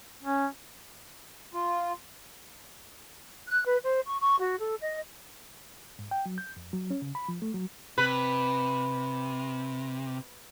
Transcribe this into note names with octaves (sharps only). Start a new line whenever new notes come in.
C#4
F4
F#6
B4
C5
C#6
C#6
F#4
A4
D#5
G#2
G5
F#3
G6
F2
F#3
C#4
C#3
B5
F3
A3
F#3
C3 B4